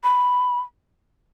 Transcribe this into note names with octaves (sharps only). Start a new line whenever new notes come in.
B5